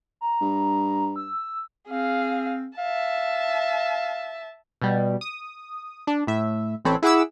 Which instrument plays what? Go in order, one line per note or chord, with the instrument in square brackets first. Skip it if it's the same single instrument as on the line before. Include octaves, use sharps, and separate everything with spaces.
[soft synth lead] A#5
[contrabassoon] G2
[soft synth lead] E6
[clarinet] C4 [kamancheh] G#4 F5
[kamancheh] E5 A5 [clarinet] F5
[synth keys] B2 G3
D#6
D4
A2 E5
A1 E3 C4 A4 C#5 B5
E4 G#4 F#5 B5 D6 E6